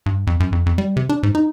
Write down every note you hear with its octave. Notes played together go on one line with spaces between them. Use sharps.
G2
F2
F#2
F2
F2
G3
C3
D4
G#2
D#4